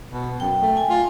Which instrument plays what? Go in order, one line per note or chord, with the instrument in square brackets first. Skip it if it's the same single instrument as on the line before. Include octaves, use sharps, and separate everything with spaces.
[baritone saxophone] B2
[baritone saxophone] F#2 [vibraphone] G5
[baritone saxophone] A3
[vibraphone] G#5
[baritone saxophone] F4